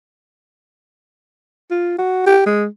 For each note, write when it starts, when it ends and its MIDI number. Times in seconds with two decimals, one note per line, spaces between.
1.71 1.98 65
1.98 2.22 66
2.26 2.43 67
2.46 2.66 56